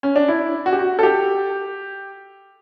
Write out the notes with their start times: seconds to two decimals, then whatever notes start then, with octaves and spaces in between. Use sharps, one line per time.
0.03 C#4
0.16 D4
0.28 E4
0.66 F#4
0.73 G4
0.79 F#4
0.99 A4
1.03 G4